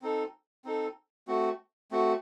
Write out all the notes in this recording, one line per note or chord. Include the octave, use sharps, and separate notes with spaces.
C4 D#4 A4
C4 D#4 A4
A3 C4 F#4
A3 C4 F#4